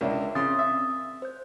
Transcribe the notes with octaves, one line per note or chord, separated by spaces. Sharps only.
C#2 D4 A#4 E5
C#3 C4 C6 D#6 A6
E5
C5 G6